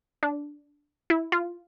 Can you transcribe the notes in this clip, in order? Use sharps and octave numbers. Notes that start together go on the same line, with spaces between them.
D4
E4
F4